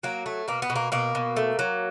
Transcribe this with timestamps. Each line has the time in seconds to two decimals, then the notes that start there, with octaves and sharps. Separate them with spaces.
0.03 F#3 A#3
0.26 A3
0.48 B2 A#3
0.62 B3
0.70 B2
0.76 A#3
0.92 B2 A#3
1.15 B2
1.36 A3
1.59 F#3